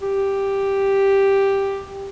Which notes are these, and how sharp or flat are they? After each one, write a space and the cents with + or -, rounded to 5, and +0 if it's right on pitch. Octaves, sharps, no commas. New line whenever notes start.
G4 +5